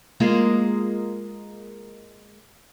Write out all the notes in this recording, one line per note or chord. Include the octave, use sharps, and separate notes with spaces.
G#3 A#3 F4